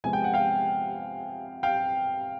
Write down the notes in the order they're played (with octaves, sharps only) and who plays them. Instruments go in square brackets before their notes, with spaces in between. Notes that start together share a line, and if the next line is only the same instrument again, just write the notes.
[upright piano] C3 F3 G#3 B3 G#5
G5
F#5
F5 G5
F5 G5